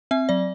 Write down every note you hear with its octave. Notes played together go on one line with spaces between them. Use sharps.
C4 E5
F#3 D5